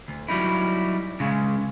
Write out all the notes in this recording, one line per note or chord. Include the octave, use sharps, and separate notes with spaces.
D2
F#3 G3 D#4 E4
C#3 G#3